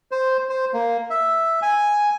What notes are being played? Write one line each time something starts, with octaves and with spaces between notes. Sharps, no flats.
C5
C5
A#3
E5
G#5